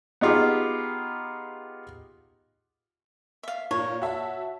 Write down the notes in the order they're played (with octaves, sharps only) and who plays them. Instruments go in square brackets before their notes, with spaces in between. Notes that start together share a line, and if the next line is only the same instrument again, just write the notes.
[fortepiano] B3 D#4 F4 G4 G#4
[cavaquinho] E5 F5
[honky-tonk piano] A#2 [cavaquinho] C#5
[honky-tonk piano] F#4 E5 A5